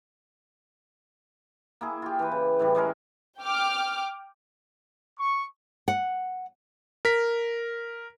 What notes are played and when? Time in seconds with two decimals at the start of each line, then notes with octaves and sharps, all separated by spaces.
1.81 A#3 E4 G#4
2.02 F4 G4
2.19 E3 B4
2.31 C#3
2.59 A2 E3 G3
2.75 G3 G#3 C#4 A#4
3.41 G5 D6 F6
5.18 C#6
5.88 F#5
7.05 A#4 B6